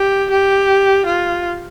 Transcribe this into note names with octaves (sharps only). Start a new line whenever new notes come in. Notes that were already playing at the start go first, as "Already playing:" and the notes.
Already playing: G4
G4
F4